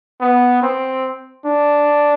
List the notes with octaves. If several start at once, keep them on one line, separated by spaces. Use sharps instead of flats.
B3
C4
D4